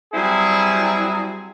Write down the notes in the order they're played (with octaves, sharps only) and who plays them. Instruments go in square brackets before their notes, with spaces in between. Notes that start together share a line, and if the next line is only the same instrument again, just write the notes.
[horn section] F#3 G3 C4 E4 G#4